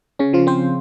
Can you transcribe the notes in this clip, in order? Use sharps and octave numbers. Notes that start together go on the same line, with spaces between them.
C#3 C#4
F3 F4
C4 C5